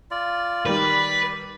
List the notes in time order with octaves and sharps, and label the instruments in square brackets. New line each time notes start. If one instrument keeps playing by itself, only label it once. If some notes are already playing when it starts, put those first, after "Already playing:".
[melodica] F4 D5
[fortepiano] D#3 G3 [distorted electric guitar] B4 [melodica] D5